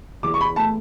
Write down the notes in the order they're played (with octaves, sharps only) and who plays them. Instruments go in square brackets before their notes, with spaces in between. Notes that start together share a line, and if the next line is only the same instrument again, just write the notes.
[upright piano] E2 D6
C#6
B5
A3 A5